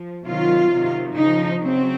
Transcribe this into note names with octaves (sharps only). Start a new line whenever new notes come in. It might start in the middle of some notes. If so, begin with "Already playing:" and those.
Already playing: F3
C3 D#3 F#3 F4
C3 D#3 F#3
C#3 F3 D#4
C#3 F#3 C4